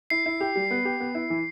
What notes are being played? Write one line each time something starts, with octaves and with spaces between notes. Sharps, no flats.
E4 C7
E4
G4
G3
B3
G4
B3
E4
E3